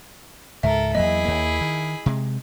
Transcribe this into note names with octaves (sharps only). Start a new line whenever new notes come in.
C#2 G#2 A4 A#4 E5
E2 F#3 A#3 E4 G#4 D#5 B5
D#2 A#3
D#3
C3 G#3